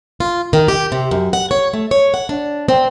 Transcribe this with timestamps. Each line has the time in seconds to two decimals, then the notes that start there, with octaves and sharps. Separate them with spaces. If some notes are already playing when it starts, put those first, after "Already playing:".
0.20 F4
0.53 D#3
0.68 G4
0.92 C3
1.11 F#2
1.33 F#5
1.51 C#5
1.74 A3
1.91 C#5
2.14 F#5
2.29 D4
2.68 C4